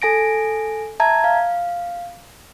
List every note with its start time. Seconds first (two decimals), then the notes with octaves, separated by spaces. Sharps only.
0.02 A4 G#5 A#6 D7
1.00 E5 A5 A#5 G#6
1.24 F5